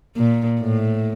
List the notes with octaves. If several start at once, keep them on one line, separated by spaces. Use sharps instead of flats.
A#2
A2